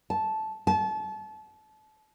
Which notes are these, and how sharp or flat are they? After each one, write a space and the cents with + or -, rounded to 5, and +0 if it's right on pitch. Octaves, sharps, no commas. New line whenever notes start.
A5 -10
A5 -30